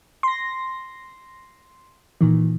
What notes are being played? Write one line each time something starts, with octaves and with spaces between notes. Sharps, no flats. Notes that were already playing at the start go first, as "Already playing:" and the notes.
C6 A#6
A#2 D#3 E3